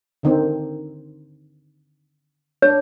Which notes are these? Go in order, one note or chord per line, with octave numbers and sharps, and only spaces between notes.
D3 D#3 C4
D4 C#5